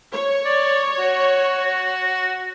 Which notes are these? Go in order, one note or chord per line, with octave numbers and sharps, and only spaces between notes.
C#5
D5
F#4